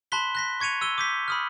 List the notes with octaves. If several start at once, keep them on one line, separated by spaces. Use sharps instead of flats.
A5 B5 C6 F#6 B6 G7
F#6 A#6 B6
C#6 G#6 C#7 D#7 F7
E6 D#7 G7
D6 G6 B6
B5 D#6 F6